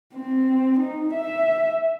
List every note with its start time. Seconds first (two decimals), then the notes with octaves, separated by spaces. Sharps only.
0.14 C4
0.79 D#4
1.14 E5